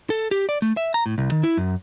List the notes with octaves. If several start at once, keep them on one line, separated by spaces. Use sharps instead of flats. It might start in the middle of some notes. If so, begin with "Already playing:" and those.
A4
G4
D5
A3
E5
A#5
A2
C2
D#3
E4
F#2